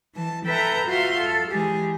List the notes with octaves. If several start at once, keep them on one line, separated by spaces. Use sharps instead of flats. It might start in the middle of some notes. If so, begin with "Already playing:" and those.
E3 A5
A4 B4 E5 G5 A#5
F4 F#4 E5 F5 C6
A4
E3 G#3 G4 G#4